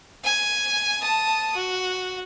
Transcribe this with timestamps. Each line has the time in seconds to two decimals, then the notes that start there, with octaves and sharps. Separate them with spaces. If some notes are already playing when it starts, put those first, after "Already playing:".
0.24 G#5
1.02 A5 D#6
1.55 F#4